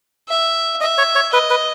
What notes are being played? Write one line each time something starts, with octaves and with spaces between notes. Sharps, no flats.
E5
D#5 E5
C#5
C#5
B4 D#5
B4